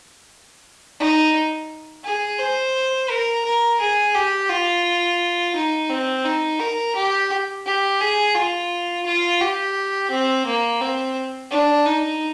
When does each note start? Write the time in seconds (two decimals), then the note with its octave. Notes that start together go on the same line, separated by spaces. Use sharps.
0.99 D#4
2.04 G#4
2.39 C5
3.10 A#4
3.44 A#4
3.80 G#4
4.14 G4
4.50 F4
5.56 D#4
5.90 C4
6.25 D#4
6.60 A#4
6.95 G4
7.66 G4
8.01 G#4
8.35 F4
9.06 F4
9.41 G4
10.10 C4
10.46 A#3
10.81 C4
11.51 D4
11.86 D#4